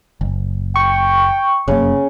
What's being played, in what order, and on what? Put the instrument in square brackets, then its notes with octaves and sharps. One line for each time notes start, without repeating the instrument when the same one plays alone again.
[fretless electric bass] F#1
[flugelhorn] G5 [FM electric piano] C#6
[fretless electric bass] F1 F#2 A#3 [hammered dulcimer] C#3